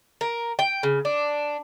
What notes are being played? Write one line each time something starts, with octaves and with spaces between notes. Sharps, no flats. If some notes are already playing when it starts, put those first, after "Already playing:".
A#4
G5
C#3
D4